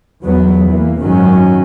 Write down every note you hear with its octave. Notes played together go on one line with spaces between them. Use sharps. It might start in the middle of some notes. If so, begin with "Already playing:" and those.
E2 F#3 B3
E3 A#3
G#1 F#2 D#3 F#3 C#4